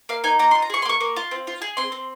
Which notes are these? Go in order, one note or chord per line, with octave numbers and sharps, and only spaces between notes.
A#3 F5
D#4 G#5
A#3 A#5
C6
F4
A#5
G#4 C#6
C6
A#3 C#6
A#3
F4
C4
F4
G#4
C4 C6
C4